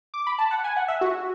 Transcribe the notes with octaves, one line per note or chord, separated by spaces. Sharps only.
D6
B5
A5
F#5
G#5
F#5
E5
F#4